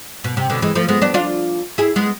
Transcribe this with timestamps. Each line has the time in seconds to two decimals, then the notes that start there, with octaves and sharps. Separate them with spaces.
0.24 B2
0.37 C3
0.50 B2 D3
0.62 E3 G#3
0.75 F3 A3
0.89 G#3 B3
1.02 B3 D4
1.14 D4 F4
1.78 E4 G#4
1.96 G#3 B3